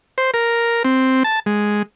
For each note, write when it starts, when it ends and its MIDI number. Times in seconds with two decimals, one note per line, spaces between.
0.18 0.31 72
0.34 0.83 70
0.85 1.23 60
1.24 1.40 81
1.46 1.83 56